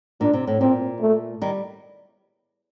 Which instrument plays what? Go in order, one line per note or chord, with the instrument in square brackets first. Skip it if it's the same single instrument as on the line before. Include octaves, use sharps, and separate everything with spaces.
[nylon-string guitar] A#2 [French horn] D4
[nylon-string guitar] C3
A2
[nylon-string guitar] A#2 [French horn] C4
[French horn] A3
[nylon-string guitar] D#3 G3